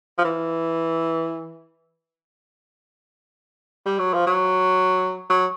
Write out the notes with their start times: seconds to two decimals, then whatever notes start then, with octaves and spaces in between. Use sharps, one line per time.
0.18 F3
0.24 E3
3.86 G3
3.98 F#3
4.13 F3
4.27 F#3
5.29 F#3